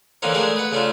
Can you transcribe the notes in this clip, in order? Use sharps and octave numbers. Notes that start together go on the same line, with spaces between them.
D3 E3 A#3 C4 C#4 D#4
G#3 A3 D4 G#4 A#4
B4 F#5
C#3 A3 D4 F4